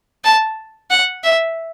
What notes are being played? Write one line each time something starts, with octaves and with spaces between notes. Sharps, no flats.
A5
F#5
E5